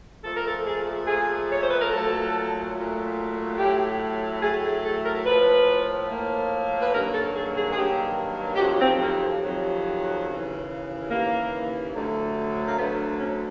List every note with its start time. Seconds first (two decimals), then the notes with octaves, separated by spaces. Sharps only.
0.24 A#2 F3 A3 A4
0.35 A#4
0.47 A4
0.65 G#4
1.07 A#2 F3 A3 G#4
1.51 C#5
1.61 C5
1.70 B4
1.80 A#4
1.91 A#2 F#3 A3 A4
2.74 A#2 F#3 A3
3.58 A2 F#3 A3 G4
4.42 A2 F#3 A3 G#4
4.62 G#4
4.84 A4
5.05 A#4
5.26 A2 F3 A#3 B4
6.09 A2 F3 A#3
6.81 B4
6.92 G2 D#3 F#3 A#3 A#4
7.14 A4
7.35 G#4
7.55 G#4
7.72 G#4
7.76 G2 D#3 F#3 A#3 G4
8.55 G4
8.59 F2 C3 D#3 F#3 F#4
8.81 C4
9.01 A#3
9.43 F2 C3 D#3 F#3
10.26 D#2 C#3 E3
11.10 D#2 C#3 E3 A#3
11.94 D2 D3 F#3 A3
12.68 A#3
12.77 D2 D3 F#3 A3 B3
13.19 C#4